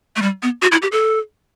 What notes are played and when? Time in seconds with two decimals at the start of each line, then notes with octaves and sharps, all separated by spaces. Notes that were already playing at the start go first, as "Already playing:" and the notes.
0.16 A3
0.22 G3
0.43 B3
0.62 F#4
0.72 E4
0.82 G4
0.92 A4